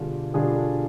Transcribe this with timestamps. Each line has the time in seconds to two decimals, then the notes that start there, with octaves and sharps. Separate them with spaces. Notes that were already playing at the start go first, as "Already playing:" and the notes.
Already playing: B2 D3 G3 D4 F4 G#4
0.34 B2 D3 G3 D4 F4 G#4